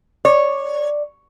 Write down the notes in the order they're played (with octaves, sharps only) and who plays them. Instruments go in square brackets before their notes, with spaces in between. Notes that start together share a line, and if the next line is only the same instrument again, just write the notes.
[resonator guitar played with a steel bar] C#5 [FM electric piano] D5